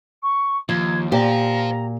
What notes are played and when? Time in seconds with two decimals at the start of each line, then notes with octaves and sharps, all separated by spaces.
0.22 C#6
0.69 D#2 F3 G#6
1.12 A#2 G4 C5 F5 A#5